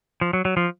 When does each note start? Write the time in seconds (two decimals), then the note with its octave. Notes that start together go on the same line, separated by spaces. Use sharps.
0.21 F3
0.33 F#3
0.45 F#3
0.57 F3